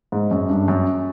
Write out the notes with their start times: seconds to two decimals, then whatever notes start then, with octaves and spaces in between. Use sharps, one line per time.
0.12 G#2
0.31 F#2
0.50 G2
0.68 F#2